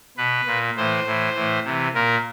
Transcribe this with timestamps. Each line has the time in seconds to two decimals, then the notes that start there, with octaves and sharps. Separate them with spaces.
0.17 B2 B4
0.47 A#2
0.76 A2 E3 C5
1.05 A2 E3
1.35 A2 E3
1.65 C3 E3
1.94 A#2 A#4